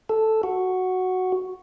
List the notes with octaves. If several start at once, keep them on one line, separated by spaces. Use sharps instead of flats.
A4
F#4